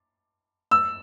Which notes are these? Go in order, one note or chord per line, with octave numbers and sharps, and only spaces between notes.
E6